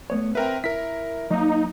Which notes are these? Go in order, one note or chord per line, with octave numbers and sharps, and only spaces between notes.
A3 B3 C#5
C4 A#4 B4 E5 F5 G5
E4 A#4 B6
F#3 A#3 D#4